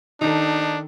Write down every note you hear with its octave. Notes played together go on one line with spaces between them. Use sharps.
D#3 D4 D#4 A4